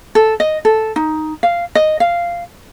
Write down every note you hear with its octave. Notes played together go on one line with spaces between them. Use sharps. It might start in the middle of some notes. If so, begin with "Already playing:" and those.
A4
D#5
A4
D#4
F5
D#5
F5